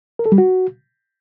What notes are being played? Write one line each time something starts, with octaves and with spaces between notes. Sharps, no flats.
A#4
A4
G3
F#4